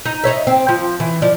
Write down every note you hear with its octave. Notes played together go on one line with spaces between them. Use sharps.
D#4
D#4 C#5 E5
C4
F3
E3
F3 D5